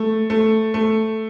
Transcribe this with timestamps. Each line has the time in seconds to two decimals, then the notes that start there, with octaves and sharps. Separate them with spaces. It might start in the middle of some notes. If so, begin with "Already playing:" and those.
Already playing: A3
0.30 A3
0.74 A3